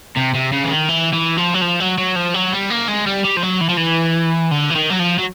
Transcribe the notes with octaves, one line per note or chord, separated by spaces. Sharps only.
C3
C3
C#3
E3
D#3
E3
E3
F3
F#3
F3
F#3
F#3
F3
F#3
G3
A#3
G#3
G3
G3
F3
F#3
E3
F3
E3
D3
E3
D#3
F#3
F3
F#3